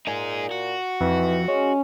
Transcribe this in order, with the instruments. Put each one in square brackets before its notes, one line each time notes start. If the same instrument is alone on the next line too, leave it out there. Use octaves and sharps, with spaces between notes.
[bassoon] A#2 [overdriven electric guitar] D#4 G#4
[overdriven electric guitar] F#4
[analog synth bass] F2 [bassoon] E3
[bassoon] G#3 [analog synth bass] C#4